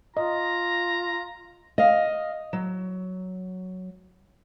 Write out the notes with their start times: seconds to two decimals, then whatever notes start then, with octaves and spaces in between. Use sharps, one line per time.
0.17 F4 D#5 A#5
1.78 D#5 F5
2.53 F#3